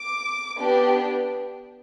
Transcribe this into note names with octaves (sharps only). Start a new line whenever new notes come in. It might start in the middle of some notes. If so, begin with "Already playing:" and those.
Already playing: D6
B3 D4 G4